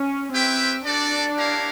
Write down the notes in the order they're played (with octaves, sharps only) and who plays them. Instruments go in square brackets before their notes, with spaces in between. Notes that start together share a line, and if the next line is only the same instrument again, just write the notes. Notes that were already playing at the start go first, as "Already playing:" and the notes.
Already playing: [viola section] C#4
[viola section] C4 [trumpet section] E4 G4 B4 E5 G5
[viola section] D4 [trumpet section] F#4 A4 D5
[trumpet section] E4 G4 A#4 C#5 F5